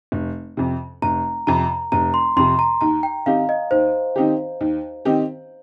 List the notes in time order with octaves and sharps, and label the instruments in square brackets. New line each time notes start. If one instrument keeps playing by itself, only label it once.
[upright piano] F1
F2 C3
[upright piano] F1 [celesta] A#5
[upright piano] F2 C3 [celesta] A#5
[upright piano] F1 [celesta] A#5
[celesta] C6
[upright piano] F2 C3 [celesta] C6
[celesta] A#5
[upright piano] D#2 [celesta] A#5
[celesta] G5
[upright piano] D#3 C4 D#4 G4 [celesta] F5
[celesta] D#5
[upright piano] D#2 [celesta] C5
[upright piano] D#3 C4 D#4 G4
D#2
D#3 C4 D#4 G4